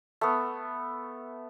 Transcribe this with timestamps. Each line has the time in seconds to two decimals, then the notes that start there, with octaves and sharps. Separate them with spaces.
0.21 A3 B3